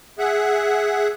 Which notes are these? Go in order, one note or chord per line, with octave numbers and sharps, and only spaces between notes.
G#4 E5 F#5